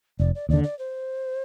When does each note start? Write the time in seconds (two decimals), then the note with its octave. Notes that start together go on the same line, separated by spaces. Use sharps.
0.20 F1 D5
0.35 D5
0.49 D#2 D3 D5
0.64 D5
0.79 C5